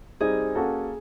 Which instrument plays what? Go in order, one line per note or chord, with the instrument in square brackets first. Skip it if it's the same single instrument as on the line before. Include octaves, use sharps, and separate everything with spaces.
[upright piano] G3 C4 D#4 [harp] G#4
[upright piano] A#3 C#4 F#4 A4